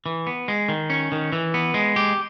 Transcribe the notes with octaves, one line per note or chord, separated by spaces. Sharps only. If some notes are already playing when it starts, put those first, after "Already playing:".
E3
B3
G#3
D#3
C#4
D#3
E3
B3
G#3
G4